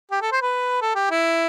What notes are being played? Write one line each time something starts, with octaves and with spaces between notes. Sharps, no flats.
G4
A4
C5
B4
A4
G4
E4